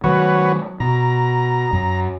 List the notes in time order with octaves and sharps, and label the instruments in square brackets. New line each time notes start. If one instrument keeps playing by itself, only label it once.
[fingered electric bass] D#3 F3 F#3 [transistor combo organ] F#4 B4 C#5
[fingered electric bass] B2 [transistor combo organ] A#5
[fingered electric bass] F#2